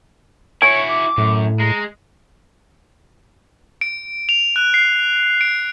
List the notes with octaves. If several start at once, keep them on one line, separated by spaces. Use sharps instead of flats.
E4 F#4 C#5 G#5
D6
F#2 A2
G#3 A#5
D7
F7
F#6
C7
D7